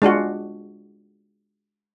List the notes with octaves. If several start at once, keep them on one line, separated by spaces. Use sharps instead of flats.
G#3 D4 F4 F#4